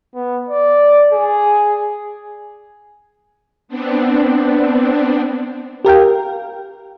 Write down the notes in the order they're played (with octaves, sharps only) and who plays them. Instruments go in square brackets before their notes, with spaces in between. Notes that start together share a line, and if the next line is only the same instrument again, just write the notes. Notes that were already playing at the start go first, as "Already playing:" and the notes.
[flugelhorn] B3
D5
G#4
[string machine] B3 C4 D4
[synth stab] G4 A#4 F5 G5